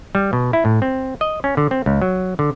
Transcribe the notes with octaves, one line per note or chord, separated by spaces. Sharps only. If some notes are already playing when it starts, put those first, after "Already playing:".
G3
B2
E4
A2
C4
D#5
C#4
D3
C4
C#2
F#3
D3